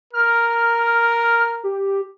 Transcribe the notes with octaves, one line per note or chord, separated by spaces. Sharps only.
A#4 F6
G4